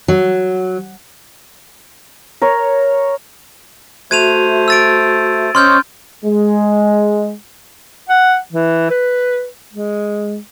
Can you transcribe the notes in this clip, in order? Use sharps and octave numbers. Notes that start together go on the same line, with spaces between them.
F#3
A#4 C#5 A#5
A3 F#4 C5 E5 G#6 D#7 F7
E6 A6 D7
C#4 C5 C#5 D#5 C6 F6 G6
G#3
F#5
E3
B4
G#3